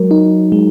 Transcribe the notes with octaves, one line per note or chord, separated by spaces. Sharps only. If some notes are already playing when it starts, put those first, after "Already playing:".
Already playing: F#3 G#3 A#4
D#4
G#3